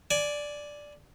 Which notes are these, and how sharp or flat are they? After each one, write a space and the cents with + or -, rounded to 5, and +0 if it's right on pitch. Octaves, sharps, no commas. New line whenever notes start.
D5 +0 G#5 +20